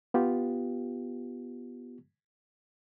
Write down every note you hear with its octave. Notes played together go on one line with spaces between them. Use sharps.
B3 F4 G4